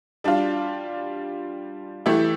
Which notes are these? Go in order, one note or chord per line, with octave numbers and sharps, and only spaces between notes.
G3 D4 F4
E3 A3 E4 G4